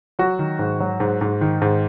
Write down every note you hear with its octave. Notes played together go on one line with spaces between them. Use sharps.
F#3 F#4
D#3
G#2
F#3
G#2
G#2
D#3
G#2